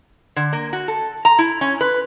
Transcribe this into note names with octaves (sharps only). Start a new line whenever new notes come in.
D3
A#3
F#4
A4
A#5
E4
C#4
B4